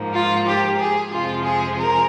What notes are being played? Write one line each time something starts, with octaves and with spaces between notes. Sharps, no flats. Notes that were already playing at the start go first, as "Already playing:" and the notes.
Already playing: G#2 F3 A#3
F4
G4
G#4
F2 C3 F3 G#3 F4
G#4
A#4